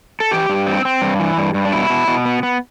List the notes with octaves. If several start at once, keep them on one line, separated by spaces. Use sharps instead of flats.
A4
E3 G4
G2
C4
C4
G2
E3
G2
G2
D4
B2 E4
B2
B2
B3
B3